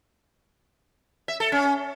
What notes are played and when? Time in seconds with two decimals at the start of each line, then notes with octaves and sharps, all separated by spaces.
1.28 E5
1.40 A4
1.52 C#4